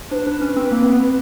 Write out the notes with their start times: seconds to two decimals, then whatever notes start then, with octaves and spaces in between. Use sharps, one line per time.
0.11 D4 C5
0.15 B4
0.27 D4
0.41 C#4
0.56 C4
0.72 A#3
0.82 C4
0.90 B3